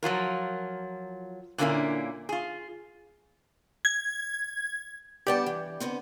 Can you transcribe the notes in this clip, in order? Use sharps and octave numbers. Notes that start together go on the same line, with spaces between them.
F3 F#3 F4 A#4
A#2 D3 A#3 B3 C#4 E4
F4 G#4
G#6
G2 B3 G4 D5 G5 A5
E3
D3 B3 C4